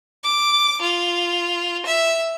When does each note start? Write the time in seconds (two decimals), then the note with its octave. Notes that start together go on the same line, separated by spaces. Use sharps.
0.24 D6
0.81 F4
1.86 E5